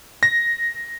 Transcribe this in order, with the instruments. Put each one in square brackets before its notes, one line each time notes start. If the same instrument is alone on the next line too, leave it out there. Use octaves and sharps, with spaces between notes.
[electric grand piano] A#6